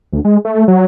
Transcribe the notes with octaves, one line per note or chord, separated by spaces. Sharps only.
D2
G#3
A3
F#3